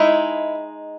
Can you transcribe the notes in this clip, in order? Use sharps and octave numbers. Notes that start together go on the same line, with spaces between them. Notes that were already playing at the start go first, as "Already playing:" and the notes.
Already playing: G#3 D#4 E4